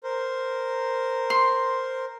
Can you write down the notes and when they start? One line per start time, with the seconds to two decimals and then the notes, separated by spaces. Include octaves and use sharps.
0.03 A#4 C5
1.30 C6